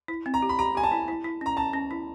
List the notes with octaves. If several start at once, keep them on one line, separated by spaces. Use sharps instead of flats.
E4
C4
A#5
G4
B5
G4 A#5
G4 G#5
A5
E4
E4
E4
C#4 A#5
C#4 A5
C#4
E4